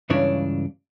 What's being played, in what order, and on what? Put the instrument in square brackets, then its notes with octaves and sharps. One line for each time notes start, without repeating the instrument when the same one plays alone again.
[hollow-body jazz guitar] C#2 G2 C#3 E3 D4 C#5